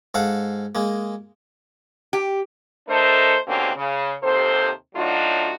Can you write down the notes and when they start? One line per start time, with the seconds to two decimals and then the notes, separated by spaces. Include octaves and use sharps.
0.14 G#2 A4 F5 F#5
0.75 G#3 A#3
2.13 G4
2.88 A3 D4 A4 A#4 C5 D#5
3.47 D#2 B2 D3 A#3 C4 C#4
3.76 C#3
4.23 D#2 C3 A4 C5
4.95 A2 F#3 D4 D#4 F4 F#4